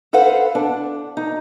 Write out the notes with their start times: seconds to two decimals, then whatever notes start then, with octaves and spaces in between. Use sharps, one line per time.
0.13 A4 B4 C5 F5 F#5
0.55 D4
1.17 D#4